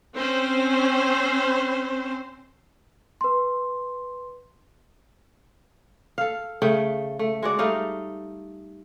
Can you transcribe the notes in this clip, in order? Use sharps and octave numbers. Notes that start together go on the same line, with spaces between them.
C4 C#4 C5
B4 C6
A4 F5
C#3 A3 G5
A3
G#3 F#4 D5
G3 A3 D#4 F5